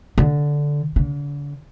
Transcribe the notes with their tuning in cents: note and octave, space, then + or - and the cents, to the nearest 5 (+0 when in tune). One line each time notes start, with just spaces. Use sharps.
D3 -5
D3 -40